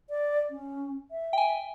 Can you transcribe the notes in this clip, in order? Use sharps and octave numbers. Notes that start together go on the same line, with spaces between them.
D5
C#4
E5
G5 G#5